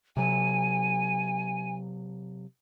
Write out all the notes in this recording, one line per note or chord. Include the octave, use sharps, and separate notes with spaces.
C3 F#3 G#5